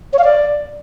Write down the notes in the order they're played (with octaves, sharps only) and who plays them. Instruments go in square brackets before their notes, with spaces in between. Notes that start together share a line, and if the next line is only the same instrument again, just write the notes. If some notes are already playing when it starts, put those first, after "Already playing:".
[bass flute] C#5
F5
D5